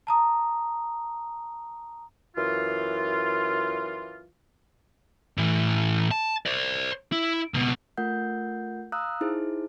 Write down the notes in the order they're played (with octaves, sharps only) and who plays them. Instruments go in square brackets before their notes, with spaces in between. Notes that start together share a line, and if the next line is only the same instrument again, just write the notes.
[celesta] A5 A#5 D#6
[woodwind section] F#2 E3 F4
[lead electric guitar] A2 E3
A5
C5 D5
E4
C#2 B2
[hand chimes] A3 F4 A#4 F#5 G6
F5 A#5 D#6 E6 F#6
D#4 E4 G#4 C5